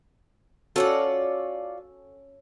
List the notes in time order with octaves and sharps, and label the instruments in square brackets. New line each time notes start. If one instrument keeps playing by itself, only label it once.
[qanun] C#4 F#4 A4 [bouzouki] F4 C#5 D5